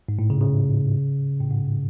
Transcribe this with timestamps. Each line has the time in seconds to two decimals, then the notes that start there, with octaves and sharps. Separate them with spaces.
0.09 G#2
0.19 A2
0.30 C#3
0.41 C#3
1.40 A2
1.51 G#2